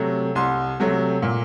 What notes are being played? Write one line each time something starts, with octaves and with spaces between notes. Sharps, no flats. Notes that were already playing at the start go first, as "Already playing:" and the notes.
Already playing: C3 F#3 A3
C2 C6
C3 F#3 A3
A#2